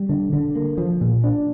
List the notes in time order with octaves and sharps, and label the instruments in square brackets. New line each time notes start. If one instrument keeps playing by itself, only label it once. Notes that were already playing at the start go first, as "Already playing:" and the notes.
Already playing: [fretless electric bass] G3
D3
D3
A#3
F3
A#2
D4